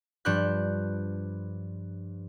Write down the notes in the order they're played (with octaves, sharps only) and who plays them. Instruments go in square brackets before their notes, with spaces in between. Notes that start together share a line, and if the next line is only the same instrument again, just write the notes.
[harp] G2 F3 D4 B4 F#6 G6